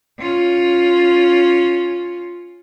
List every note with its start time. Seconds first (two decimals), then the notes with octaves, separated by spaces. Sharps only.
0.19 C#4 F4